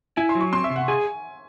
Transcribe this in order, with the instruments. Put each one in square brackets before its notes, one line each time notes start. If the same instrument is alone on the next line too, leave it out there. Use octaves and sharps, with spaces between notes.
[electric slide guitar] E4 [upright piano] G#5
[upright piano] C6
[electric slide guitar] F#3
[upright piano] C#6
[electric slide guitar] C4 [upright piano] C6
[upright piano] E5
[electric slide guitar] C3
[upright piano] F#5
[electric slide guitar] G#4 [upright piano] G#5